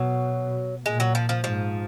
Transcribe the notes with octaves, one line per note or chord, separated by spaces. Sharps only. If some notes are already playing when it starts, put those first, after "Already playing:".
Already playing: B2 F#3
A#2 G#3
F#3
F3
F3
G#2 F3